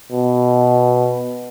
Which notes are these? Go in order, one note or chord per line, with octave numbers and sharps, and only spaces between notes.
B2